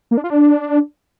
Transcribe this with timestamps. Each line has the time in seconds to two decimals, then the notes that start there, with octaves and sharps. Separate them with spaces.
0.11 A#3
0.17 D4
0.24 F4
0.30 D4